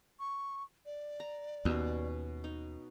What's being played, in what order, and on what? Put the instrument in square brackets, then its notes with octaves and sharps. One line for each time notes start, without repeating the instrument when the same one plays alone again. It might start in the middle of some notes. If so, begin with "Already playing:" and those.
[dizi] C#6
D5
[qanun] A#5
[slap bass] D#2 [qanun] B2 C#4
[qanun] D#4